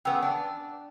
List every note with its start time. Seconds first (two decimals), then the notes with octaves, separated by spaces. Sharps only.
0.05 C#3 B3 G5 E6
0.22 D4